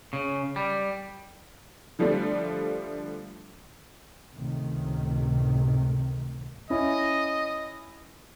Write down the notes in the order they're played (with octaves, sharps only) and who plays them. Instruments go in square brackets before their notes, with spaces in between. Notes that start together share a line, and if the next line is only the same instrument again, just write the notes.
[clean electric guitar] C#3
G3
[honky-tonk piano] D3 F3 G3 A3 D4
[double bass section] C#2 A2 C3 D#3
[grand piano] C#4 E4 [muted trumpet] D#5